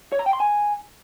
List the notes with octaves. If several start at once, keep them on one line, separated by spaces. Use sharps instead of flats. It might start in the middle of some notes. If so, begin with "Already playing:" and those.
C#5
A#5
G5
C6
G#5